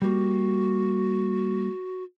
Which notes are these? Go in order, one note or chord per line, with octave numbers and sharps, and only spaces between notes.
G3 A#3 F#4